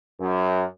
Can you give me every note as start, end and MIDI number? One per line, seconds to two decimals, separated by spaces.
0.20 0.63 42